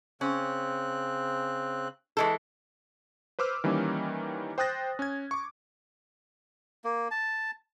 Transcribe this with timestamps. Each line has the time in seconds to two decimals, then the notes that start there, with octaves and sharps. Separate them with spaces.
0.21 C#3 C4 C#4 F#6
2.17 E3 G#3 A4
3.39 B4 C5 D6 E6 F6
3.64 D#3 E3 G3 A#3 C#4
4.58 C5 G5 D#6 F#6 A6 A#6
4.99 C#4 G#6
5.31 C#6 D6
6.84 A#3
7.11 A5